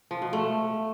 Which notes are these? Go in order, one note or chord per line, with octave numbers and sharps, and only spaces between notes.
F3
B2
A3